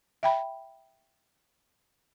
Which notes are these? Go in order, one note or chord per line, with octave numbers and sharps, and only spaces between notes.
E5 G5 B5